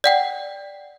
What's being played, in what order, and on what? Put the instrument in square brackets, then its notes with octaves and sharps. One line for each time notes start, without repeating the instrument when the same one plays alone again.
[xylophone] D5 F#5 G5